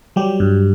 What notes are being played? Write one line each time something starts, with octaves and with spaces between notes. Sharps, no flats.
F#3 G3 G4
G2